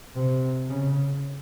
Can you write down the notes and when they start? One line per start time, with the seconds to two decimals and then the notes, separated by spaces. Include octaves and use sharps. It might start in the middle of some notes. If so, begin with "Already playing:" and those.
0.16 C3
0.70 C#3